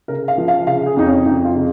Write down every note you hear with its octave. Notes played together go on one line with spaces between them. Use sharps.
C#3 A#4
F5
F3
F5
C#3 F5
G#4
F2 D#4
C#4
F2 D#4
F4
C#3